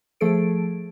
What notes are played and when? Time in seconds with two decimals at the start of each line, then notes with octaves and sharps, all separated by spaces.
0.21 F3 A3 G#4 A4 D7